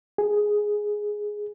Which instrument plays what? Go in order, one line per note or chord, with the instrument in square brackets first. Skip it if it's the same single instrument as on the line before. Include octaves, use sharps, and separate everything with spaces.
[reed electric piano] G#4